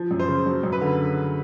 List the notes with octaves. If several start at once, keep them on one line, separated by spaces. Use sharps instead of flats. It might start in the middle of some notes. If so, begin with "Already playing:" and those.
Already playing: F3
F#2
C5
C#3
F#3
F#2
B4
D3